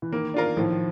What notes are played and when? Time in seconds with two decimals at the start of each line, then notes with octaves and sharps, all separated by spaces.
0.02 E3
0.12 D#3 A#3
0.34 D4 F4 A#4
0.57 A2 D#3 F3